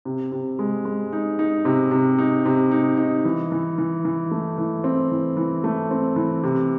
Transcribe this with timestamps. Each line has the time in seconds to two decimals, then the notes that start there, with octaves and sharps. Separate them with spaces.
0.05 C3
0.32 C3
0.59 G#3
0.85 G#3
1.13 D#4
1.39 D#4
1.65 C3
1.91 C3
2.18 D#4
2.46 C3
2.71 D#4
2.97 D#4
3.25 E3
3.52 E3
3.78 E3
4.05 E3
4.31 A3
4.58 E3
4.84 C4
5.11 E3
5.37 E3
5.64 A3
5.91 C4
6.16 E3
6.43 C3